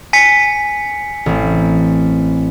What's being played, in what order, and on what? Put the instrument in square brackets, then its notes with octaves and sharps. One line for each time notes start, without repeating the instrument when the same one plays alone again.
[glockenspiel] G#5 B6 C#7
[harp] A1 C4